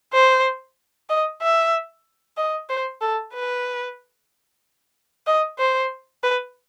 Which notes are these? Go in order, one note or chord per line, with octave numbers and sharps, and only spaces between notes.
C5
D#5
E5
D#5
C5
A4
B4
D#5
C5
B4